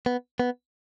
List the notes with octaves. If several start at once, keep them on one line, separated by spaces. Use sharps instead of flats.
B3
B3